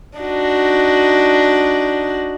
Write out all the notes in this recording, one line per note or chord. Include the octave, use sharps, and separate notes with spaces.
D4 D#4 F#4